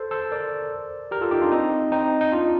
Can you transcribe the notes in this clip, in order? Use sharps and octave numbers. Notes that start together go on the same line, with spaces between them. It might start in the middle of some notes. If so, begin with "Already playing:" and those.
Already playing: A4 C5
A4 C5
A#4 D5
G4 A#4
F4 A4
D#4 G4
D4 F4
C4 D#4
C4 D#4
D#4
D4 F4